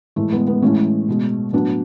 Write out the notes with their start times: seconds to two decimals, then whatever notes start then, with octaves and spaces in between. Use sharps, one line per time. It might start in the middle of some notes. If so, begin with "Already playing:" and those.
0.16 A2 E3 G#3 A3
0.32 G#3 B3
0.47 G#3 B3
0.62 A2 E3 G#3 A3 C#4
1.08 B2 G#3
1.53 A2 F#3 B3 D4